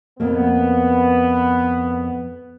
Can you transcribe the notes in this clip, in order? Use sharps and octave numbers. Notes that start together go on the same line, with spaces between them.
F2 A#3 B3